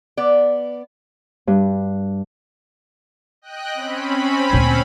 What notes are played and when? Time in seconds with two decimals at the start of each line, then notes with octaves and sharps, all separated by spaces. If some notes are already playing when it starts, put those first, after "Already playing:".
0.17 B3 D5
1.47 G2
3.42 D#5 G5 F#6
3.74 C4 C#4 B5
4.53 D2 A#2